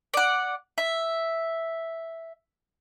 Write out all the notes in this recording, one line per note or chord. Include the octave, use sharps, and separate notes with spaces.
D5 F#5
E5